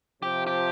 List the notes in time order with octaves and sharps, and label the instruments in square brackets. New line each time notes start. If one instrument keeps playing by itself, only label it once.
[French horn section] C3 F3 [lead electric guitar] G4
[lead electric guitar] G4